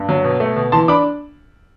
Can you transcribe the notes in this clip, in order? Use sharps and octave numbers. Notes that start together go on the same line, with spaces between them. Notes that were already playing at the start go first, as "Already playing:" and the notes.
Already playing: G2
F#3
B2
A3
B2
E3 A5 C6
D4 B5 D6